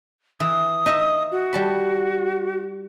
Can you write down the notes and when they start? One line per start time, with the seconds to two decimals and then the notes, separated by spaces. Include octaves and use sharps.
0.40 E3 D#6
0.86 D#4 D#5 E5
1.32 F#4
1.53 G3 A5 B5